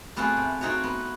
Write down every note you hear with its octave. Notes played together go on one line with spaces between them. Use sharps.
A3 B3 C4 F4 F#4 G#4
C3
C4 D#4 F#4 A4 C#5
B3